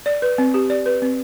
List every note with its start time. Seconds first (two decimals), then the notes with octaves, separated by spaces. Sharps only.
0.06 D5
0.22 B4
0.38 C4
0.54 G4
0.70 D5
0.86 B4
1.02 C4